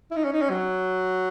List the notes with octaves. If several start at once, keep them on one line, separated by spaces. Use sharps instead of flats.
E4
D#4
C#4
D#4
C#4
F#3